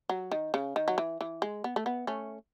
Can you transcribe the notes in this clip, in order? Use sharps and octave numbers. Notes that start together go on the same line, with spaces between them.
F#3
D#3
C#3
D#3
F#3
E3
E3
G#3
B3
A3
B3
A3 C#4